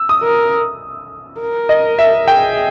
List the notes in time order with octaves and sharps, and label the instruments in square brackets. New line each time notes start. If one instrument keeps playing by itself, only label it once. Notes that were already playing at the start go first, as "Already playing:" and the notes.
Already playing: [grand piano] E6
D#6
[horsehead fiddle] A#4
A#4
[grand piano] D#5
E5
[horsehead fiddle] G#4 [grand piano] G5